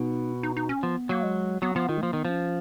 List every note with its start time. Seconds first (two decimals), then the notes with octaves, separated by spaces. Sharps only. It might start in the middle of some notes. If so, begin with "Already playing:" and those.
Already playing: B2 D#4
0.43 D#4
0.57 D#4
0.69 C#4
0.83 F3 B3
1.09 F#3 A#3
1.23 G#3
1.62 F#3 B3
1.76 F3 B3
1.89 D#3 F4
1.98 G#3
2.02 F3 A#3
2.13 D#3 B3
2.25 F3 C#4